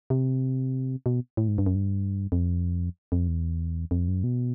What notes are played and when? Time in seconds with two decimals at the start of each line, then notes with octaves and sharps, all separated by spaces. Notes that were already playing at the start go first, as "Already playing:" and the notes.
0.10 C3
1.06 B2
1.37 A2
1.48 G#2
1.58 G2
1.66 F#2
1.75 G2
2.32 F2
3.12 F2
3.28 E2
3.91 F2
4.08 F#2
4.24 B2